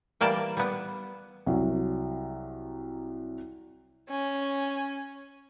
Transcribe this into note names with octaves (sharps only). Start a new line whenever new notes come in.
E3 G3 A#3 D5 A5
G3 B3
C2 F#3
C#4